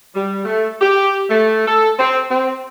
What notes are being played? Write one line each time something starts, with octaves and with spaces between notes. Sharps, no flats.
G3
A3
G4
A3
A4
C4
C4